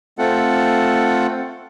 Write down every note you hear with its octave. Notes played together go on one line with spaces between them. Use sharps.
A3 C4 F4 A4 F#5